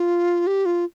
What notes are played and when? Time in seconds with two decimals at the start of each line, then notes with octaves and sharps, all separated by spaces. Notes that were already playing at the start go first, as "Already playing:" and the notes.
Already playing: F4
0.47 G4
0.66 F4